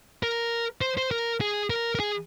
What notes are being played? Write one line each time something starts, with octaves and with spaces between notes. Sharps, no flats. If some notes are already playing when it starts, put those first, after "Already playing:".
A#4
C5
C5
A#4
G#4
A#4
A#4
G#4